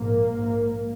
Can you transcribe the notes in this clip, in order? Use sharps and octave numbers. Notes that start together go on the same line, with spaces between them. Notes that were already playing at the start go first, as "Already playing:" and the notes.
Already playing: A#1 G#2 A#3
A#1 G#2